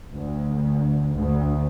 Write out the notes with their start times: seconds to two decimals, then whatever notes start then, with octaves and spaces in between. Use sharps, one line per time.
0.16 D2
1.16 D2